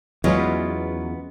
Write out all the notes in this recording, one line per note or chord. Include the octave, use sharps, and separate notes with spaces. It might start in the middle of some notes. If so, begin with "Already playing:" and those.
E2 F#3 G#3 B3 C#4 F4 G#4 B4